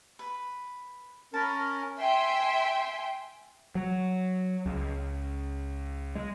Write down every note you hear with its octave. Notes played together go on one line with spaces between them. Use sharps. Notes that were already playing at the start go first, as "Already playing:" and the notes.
B4
C#4 A#4 A5 B5
E5 G5 G#5 C6
F#3
C#2
G#3